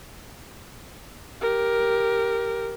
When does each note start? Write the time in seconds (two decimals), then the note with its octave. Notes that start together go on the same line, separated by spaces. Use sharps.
1.41 G4 A#4